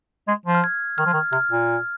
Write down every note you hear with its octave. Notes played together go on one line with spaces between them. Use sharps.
G#3
F3
F6
G#6
D#3 F6
F3
D#3
C3 F6
A#2